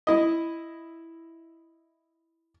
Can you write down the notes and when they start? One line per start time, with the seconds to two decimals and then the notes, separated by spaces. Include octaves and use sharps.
0.07 E4 D#5